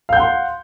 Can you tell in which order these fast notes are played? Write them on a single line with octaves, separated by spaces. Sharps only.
F5 G6 F#5 C6